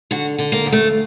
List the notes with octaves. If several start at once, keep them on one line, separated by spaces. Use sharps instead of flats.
D3 F#4
D3
A#3
D2
A3